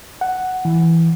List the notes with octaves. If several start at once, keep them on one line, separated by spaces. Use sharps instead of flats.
F#5
E3